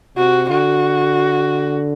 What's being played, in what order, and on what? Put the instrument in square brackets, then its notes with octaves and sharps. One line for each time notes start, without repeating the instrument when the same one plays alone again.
[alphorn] C3 [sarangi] F#4
[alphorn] D3 [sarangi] F#4